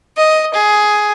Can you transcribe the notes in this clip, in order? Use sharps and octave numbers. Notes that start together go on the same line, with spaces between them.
D#5
G#4